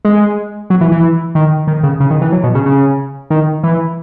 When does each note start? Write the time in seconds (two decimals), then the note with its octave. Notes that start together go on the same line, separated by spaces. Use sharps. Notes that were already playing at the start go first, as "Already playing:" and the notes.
0.05 G#3
0.70 F#3
0.81 E3
0.92 E3
1.35 D#3
1.67 D#3
1.83 C#3
2.00 C#3
2.10 D#3
2.21 E3
2.32 F#3
2.43 B2
2.55 C#3
2.66 C#3
3.30 D#3
3.63 E3